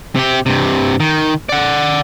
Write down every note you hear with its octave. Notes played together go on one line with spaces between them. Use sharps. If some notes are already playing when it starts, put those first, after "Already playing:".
C3 G4
G2 C3
D#3
D5 F#5